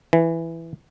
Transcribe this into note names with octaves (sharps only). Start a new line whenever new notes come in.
E3